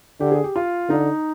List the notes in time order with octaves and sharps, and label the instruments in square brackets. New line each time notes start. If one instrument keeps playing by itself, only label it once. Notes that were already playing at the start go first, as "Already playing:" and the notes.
[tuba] D3 [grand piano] G4
[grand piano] G#4
G4
F4
[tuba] D3 [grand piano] D#4